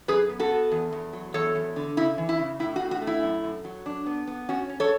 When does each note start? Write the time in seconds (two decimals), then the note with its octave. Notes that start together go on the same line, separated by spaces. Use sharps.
0.08 F#2 G#4 B4
0.29 B3
0.39 F#4 A4
0.51 B3
0.71 E2
0.93 E2
1.13 F#3
1.34 E2 A4 C#5
1.55 E2
1.76 D3
1.97 C#3 E4
2.18 E3
2.29 E4
2.39 C#3
2.59 A2 E4
2.76 F#4
2.81 A2
2.91 F#4
3.02 A3
3.07 E4
3.23 F#2
3.44 F#2
3.65 F#3
3.86 D4
4.06 B3
4.27 B3
4.49 C#4 F#4
4.69 C#4
4.80 A4 C#5